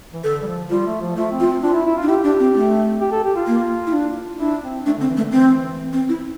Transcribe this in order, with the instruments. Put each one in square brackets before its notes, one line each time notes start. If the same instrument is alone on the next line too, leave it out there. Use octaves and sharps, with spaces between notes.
[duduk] E3
[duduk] D3 [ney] A4
[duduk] G3
F3
[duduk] G3 [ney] F4
[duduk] A3
F3
[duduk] A3 [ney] F4
[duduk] C4
[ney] F4
[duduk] C4
[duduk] D4 [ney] F4
[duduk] E4
E4
F4
[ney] D4
[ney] E4 [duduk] G4
[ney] D4
C4
A3
[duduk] G4
A4
G4
F4
[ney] A#3
E4
D4
[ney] D4 [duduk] E4
[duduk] C4
[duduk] A3 [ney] D4
[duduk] D3
[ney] C4
[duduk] E3
[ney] A3
[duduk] D3
[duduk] E3 [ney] C4
[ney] C4
E4